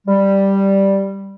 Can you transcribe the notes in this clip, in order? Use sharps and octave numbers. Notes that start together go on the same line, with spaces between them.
G3